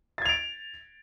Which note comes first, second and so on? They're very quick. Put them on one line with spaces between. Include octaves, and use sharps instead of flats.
A6 G#6 F7 D7